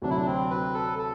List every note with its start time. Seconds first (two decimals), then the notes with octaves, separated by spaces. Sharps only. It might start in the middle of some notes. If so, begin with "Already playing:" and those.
0.02 D2 C3 F#3 D4
0.10 E4
0.16 D4
0.26 C4
0.50 B4
0.74 A4
0.99 A4